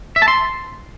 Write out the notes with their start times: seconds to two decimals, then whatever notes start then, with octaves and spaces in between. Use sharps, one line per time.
0.16 E5
0.22 A5
0.28 C6